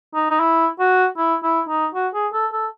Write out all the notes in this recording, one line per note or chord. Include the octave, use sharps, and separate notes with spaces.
D#4
D#4
E4
F#4
E4
E4
D#4
F#4
G#4
A4
A4